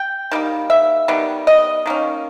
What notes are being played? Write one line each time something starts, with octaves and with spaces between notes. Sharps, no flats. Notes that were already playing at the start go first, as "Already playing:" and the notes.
Already playing: G5
D#3 G3 A#3
E5
D#3 G3 B3
D#5
D#3 A#3 C#4